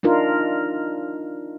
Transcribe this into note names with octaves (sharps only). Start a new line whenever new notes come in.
D4 D#4 F4 A#4